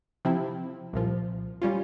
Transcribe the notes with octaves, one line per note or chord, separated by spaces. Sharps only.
C3 F3 C4 E4
C2 A#2 F3
G3 C#4 F4